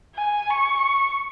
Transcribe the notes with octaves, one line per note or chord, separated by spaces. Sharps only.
G#5
C#6